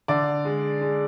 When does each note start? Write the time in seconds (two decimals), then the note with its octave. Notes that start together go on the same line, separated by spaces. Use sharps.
0.08 D3 D5
0.45 G#3
0.81 G#3